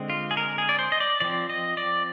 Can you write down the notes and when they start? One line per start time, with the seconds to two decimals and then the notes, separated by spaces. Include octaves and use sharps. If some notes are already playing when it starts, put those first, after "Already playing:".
Already playing: D3 G#3 C4
0.10 F4
0.31 G#4
0.37 A#4
0.58 G#4
0.69 D5
0.79 C5
0.92 D#5
1.00 D5
1.20 F3 C4 D5
1.50 D#5
1.77 D5